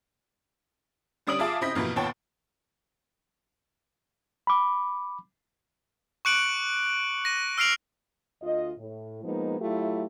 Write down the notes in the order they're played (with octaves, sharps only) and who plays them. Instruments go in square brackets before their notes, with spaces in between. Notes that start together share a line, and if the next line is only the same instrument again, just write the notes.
[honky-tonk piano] D3 G3 C#4 D#6 D7 F#7
F4 G#4 E5 F5 A5 D6
C#3 C4 E4 D#5 G6 B6
F2 B2 E3 A#3
D#2 A#2 B3 C#5 G5 A5
[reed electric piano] B5 D6
[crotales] C#6 D6 F#6 C#7 D7 F#7
A#6 D#7
E6 F6 C7 D7 F7 F#7
[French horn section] D2 F4 D#5
A2
F3 G#3 A#3 B3 D#4
F#3 A3 E4 F4 G4